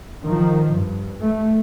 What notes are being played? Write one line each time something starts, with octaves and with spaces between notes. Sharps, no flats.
D#3 F3
G2
A3